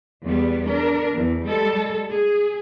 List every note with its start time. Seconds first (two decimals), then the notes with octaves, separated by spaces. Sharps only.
0.24 E2 G3 B3
0.66 D4 A#4
1.13 E2
1.44 G3 G#3 A4
2.11 G#4